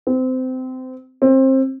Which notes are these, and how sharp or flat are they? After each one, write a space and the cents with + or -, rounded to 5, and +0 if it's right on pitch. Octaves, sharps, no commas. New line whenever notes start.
C4 -25
C4 +25